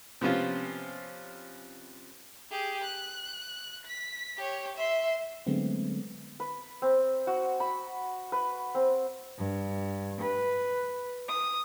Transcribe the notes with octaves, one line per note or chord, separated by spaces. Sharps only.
C3 F3 B3 C#4 F4
G4 G#4
F#6
B6
G4 C#5
E5 C6
D3 F#3 G#3 A3 B3 C4
B4
C4
F#4
B5
B4
C4
G2
B4
D#6